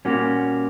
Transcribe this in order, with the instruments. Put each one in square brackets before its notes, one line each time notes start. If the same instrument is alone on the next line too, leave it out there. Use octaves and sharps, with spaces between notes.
[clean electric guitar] A#2 G3 A#3 C#4 F#4